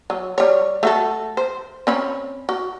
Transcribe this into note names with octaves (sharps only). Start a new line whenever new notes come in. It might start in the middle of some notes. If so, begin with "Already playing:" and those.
F#3
G3 C#5
A3 F#4 A4
C5
C4 C#4 B5
F#4